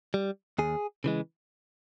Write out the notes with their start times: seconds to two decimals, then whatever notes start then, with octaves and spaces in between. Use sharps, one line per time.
0.14 G3
0.58 D#2 G#4
1.04 C#3 E3 G#3